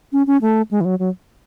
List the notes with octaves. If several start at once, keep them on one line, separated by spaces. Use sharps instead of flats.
C#4
C#4
A3
G#3
E3
F#3
F#3